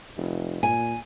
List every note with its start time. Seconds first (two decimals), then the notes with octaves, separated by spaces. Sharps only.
0.17 F1
0.63 A#2 G#5